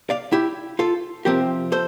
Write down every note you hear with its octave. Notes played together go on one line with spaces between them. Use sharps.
D5 F5
E4 G4
F4 A4
C3 F3 C4 G4 A#4
A4 C5